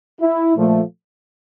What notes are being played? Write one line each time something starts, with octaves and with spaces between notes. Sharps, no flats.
E4
A#2 F3 A3